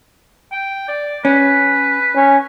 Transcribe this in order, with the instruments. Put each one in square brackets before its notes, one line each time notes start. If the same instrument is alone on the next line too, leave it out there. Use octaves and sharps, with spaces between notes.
[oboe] G5
D5
[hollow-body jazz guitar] C#4 [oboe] B4
[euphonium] C#4